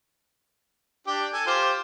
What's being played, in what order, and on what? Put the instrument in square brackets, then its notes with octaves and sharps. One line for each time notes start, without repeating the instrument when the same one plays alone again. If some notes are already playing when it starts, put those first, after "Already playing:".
[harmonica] D4 G4
A4 G#5
F4 G4 C5